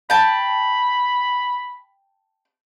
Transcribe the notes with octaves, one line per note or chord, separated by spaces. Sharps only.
G5 A5 B5